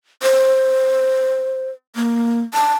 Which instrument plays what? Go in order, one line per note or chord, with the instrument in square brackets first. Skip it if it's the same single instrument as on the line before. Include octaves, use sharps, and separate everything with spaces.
[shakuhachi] C5
A#3
A5